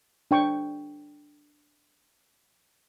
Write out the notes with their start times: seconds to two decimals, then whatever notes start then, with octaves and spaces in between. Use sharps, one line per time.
0.31 D4 G5 C#6